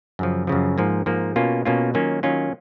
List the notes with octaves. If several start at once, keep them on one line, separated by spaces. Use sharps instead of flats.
F#2 C#3 F3
F#2 C#3 F3
G#2 F3 A#3
G#2 F3 A#3
B2 A#3 C#4 F4
B2 A#3 C#4 F4
D#3 F#3 A#3 C#4 F4
D#3 F#3 A#3 C#4 F4